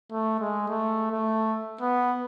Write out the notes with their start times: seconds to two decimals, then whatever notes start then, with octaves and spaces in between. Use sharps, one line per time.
0.11 A3
0.40 G#3
0.69 A3
1.11 A3
1.82 B3